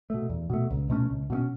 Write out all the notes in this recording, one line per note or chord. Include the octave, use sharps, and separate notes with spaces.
B2 A3
E2
B2 A3
C#2
B2 A3 C#4
C#2
B2 A3 C#4